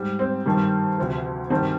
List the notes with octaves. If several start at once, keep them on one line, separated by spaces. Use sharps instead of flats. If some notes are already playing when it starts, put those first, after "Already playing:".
Already playing: G#2 G3
C4
G2 D#3 G3
D2 C3 F3
G2 D#3 G3 C4